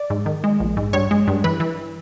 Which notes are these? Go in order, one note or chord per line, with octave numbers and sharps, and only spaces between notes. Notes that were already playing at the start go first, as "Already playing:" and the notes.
Already playing: D5
G#2
D#3
G#3
A#1
G#2
G2 C#5
G#3
G2
E3 B4
E3